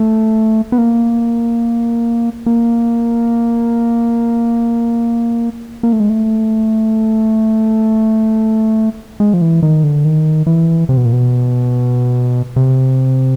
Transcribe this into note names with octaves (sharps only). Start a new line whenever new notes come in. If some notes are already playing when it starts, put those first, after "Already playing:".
Already playing: A3
B3
A#3
A#3
A#3
A3
G#3
A3
G#3
F3
E3
D#3
D3
D#3
E3
C3
B2
A#2
B2
C3